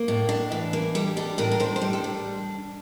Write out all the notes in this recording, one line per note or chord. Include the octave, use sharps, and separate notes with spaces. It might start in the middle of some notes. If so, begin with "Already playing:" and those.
Already playing: A#3
A2
D4
E3
A#3
G3 A4
D4 A4
A2 A#4
A#4
A2 C5
C5
G3
A4
D4